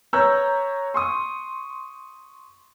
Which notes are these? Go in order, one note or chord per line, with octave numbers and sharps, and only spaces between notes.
B4 C#5 A#5 E6 F#6 G6
C6 C#6 D#6